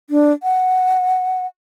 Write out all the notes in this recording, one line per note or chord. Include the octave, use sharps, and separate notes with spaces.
D4
F#5